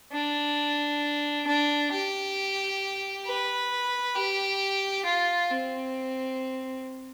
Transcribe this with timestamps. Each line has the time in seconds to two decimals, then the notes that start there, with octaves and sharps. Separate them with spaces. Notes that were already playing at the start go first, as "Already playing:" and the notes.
0.13 D4
1.47 D4
1.92 G4
3.27 B4
4.16 G4
5.05 F4
5.50 C4